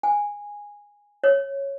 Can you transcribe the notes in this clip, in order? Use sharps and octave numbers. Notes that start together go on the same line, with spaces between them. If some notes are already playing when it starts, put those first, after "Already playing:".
G#5
C#5